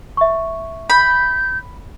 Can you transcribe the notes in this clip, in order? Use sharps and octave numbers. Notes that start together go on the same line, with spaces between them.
E5 C#6
B5 G6